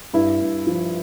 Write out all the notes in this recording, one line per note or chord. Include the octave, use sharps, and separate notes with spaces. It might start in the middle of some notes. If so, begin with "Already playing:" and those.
G2 E4
G2
F3